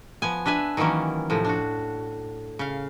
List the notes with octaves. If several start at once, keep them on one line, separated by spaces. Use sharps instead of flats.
F3 B3 G#5
D4 B4 E5 G#5
D#3 E3 F#3 A#3 C#4
A2 C3 F3
D4 F#4
C#3 F5